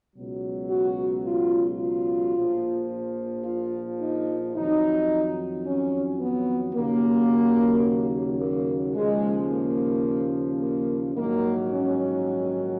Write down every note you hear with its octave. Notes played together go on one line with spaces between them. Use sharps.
C#2 B2 F#3
F#4
F4
F4
A#1 A#2 F3
F4
D#4
F2 D#3 F#3 D#4
C#4
B3
D#2 C#3 F#3 A#3
A#3
D#2 C#3 F3 G#3
A#3
A#3
A#1 G#2 D#3 F#3 A#3
C#4